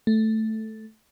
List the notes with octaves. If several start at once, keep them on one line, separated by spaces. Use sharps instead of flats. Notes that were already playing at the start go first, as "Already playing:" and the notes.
A3